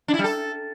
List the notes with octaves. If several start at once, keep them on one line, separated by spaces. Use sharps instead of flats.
D4
E4
G3
A4